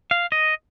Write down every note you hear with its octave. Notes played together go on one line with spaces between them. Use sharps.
F5
D#5